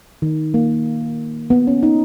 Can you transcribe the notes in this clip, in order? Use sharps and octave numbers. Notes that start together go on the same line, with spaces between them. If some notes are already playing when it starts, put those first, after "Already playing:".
D#3
A#3
B3
C#4
D#4